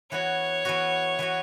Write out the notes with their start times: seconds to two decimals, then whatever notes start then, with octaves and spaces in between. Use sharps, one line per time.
0.11 E3 B3 F#4 C#5
0.65 E3 B3 F#4
1.19 E3 B3 F#4